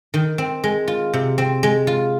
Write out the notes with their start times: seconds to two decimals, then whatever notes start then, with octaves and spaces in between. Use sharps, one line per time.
0.14 D#3
0.38 C4
0.64 G#3
0.88 F4
1.13 C3
1.38 C4
1.63 G#3
1.87 F4